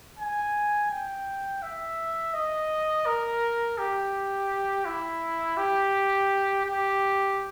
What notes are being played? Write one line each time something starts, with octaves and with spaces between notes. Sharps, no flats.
G#5
G5
E5
D#5
A#4
G4
E4
G4
G4